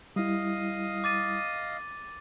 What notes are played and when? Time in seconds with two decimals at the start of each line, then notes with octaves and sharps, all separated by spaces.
0.16 G3 E4 D#5 F5 D#6
1.04 D6 A6 D#7